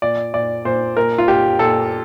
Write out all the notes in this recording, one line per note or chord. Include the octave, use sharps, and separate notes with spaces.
A#2 D5
A#2 D5
A#2 C5
A#2 A#4
F4
A#2 G4
A#2 A4